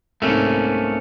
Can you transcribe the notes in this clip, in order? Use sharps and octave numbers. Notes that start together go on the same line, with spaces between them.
C2 G#2 A3 A#3 C#4